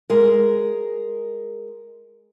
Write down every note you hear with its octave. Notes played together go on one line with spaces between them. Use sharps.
G#3 A#4